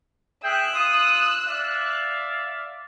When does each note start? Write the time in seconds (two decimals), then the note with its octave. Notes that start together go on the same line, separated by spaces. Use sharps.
0.44 G#4 E5 G5 E6 F#6
0.73 F4 D#6
1.48 D5 E5 F5